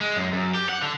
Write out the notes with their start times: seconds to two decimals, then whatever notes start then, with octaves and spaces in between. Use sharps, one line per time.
0.01 G#3
0.16 F#2
0.33 F#2
0.55 G4
0.69 F#5
0.82 D3